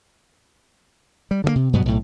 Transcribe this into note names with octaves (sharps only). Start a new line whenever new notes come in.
G3
D3 E3 A#3
C3
G2 B2 F#3 B3
B1 A2